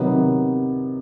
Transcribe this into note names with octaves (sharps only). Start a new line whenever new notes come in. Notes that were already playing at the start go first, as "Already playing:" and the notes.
Already playing: C3 D#3 F#3 B3 D#4